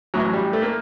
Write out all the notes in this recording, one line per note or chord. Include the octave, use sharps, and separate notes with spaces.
A1 A2 E3 F#3
G3
A3
A#3